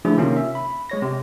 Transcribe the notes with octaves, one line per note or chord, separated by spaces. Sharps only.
D3 F3 A3 D4 E4 G#4
C3 D#3 A#3 C#4 F4
E5
B5
G#3 C#5 A#6
C3